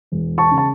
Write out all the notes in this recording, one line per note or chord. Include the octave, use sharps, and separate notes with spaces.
E1
A5 C#6
C#3
A5